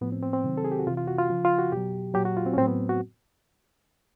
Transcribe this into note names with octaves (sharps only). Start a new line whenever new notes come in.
A2 F3 B3
C4
C4
C4
C3 D#3 F#3
A4
G#4
G4
F#4
C3 E3 F4
F4
F#4
F4
C#3 F3
F4
F#4
B2 F#3 G4
A#2 F#3 G4
F#4
F4
C4
C#4
A2 F#3 C4
B3
F#4